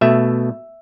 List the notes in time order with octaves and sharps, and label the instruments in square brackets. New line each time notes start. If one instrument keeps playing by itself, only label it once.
[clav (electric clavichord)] B2 A3 E5